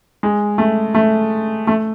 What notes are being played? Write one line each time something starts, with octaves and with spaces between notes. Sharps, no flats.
G#3
A3
A3
A3